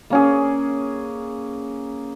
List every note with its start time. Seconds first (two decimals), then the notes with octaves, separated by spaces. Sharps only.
0.10 A#3 C#4 G#4